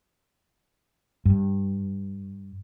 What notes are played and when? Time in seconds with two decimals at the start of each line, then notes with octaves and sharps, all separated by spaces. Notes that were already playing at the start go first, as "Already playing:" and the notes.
1.25 G2